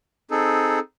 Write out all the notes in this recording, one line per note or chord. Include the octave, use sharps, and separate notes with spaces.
C4 D#4 G#4 A4